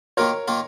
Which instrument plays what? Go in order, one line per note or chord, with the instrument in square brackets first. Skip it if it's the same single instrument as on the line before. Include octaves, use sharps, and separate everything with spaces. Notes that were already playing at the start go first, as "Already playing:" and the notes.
[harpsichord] D#3 A#3 F4 [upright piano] A#4 C#5
[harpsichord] D#3 A#3 F4